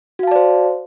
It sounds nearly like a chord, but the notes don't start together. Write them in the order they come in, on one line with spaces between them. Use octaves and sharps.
F#4 F5 A5 D5 C5